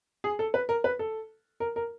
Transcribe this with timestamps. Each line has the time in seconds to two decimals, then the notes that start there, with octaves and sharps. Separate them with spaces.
0.24 G#4
0.39 A4
0.54 B4
0.69 A#4
0.84 B4
0.99 A4
1.60 A#4
1.76 A#4